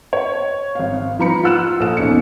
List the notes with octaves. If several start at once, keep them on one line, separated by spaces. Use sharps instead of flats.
C#5
G#1 F5
F3 B4 A#5 B5 C#7
F4 F#5 E6 F#6 E7
A#1 A4 E7
E1 C#4 D#4 C#7